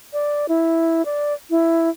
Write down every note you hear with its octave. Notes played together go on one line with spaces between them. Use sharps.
D5
E4
D5
E4